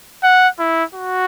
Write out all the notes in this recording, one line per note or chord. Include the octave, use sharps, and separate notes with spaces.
F#5
E4
F#4